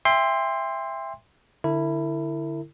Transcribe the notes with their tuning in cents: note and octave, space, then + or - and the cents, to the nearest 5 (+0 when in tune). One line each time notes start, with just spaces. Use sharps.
E5 +5 G5 +35 C6 +0
D3 -5 E4 +0 A#4 -45